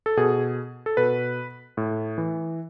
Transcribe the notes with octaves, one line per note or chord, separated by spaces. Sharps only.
A4
B2 G#4
A4
B2 B4
A2
E3